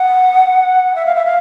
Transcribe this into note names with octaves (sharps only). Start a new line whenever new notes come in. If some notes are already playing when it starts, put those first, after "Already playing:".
Already playing: F#5
E5
F5
E5
F5